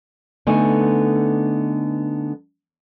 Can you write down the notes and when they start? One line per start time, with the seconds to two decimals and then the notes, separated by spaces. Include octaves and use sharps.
0.47 D3 A3 B3 D#4 G#5